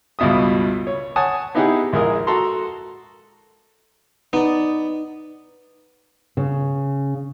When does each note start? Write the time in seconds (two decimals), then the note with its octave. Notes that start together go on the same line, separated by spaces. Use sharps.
0.19 C#2 G2 B2 E5 D#6
0.87 C#5
1.16 C#5 F#5 G#5 A5 D#6
1.55 B3 D#4 E4 G4 G#4 F#5
1.93 A#1 G#3 E4 A#4 D#6
2.27 F#4 A4 A#5 C6
4.33 B3 D#4 D5
6.37 C#3